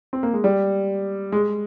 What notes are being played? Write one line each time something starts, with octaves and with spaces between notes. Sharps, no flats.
C4
A#3
G#3
G3
G#3